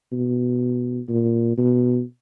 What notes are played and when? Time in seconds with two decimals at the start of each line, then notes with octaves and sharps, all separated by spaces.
0.12 B2
1.09 A#2
1.58 B2